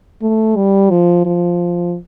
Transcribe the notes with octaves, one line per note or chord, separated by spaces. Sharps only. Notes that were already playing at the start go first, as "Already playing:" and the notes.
A3
G3
F3
F3